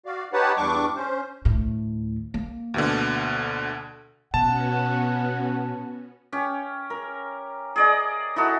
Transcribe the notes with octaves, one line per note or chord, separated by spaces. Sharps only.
F#4 D5 F5
D#4 G4 B4 C#5 F#5 A5
E2 G2 G3 D4 C#6 D6
C#4 C5
D2 A2
A#3
D2 B2 D3
B2 B3 C#4 F#4 F#5 A5
C#4 G4
A#4
G#4 D5 D#5
D#4 E4 F#4 A4